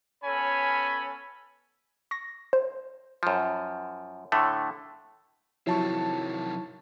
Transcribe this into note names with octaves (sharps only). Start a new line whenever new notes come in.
B3 C#4 A4 C#5 G#5 B5
C#6 A#6
C5
F#2 F3
A2 D3 A3
C3 D#3 F3 F#3 E4 C#5 A5 C#6